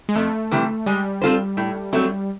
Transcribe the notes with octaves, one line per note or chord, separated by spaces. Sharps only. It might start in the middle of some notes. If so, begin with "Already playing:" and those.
G#3
F2 A3
C3 E3 G3
G3 G#3
C4 F4 A4 C5
A2
F#3 A3 C4